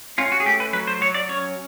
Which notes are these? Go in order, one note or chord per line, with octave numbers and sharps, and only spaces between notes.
C#4 F4
F#4
G#4
A3 G4
B4
F#3 B4
C5
F#3 C#5
D5
C#4 C#5